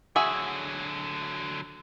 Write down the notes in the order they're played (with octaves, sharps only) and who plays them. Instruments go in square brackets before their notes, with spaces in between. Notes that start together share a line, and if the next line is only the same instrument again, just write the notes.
[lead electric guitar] D3 F#3 [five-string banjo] F#4 G#4 E5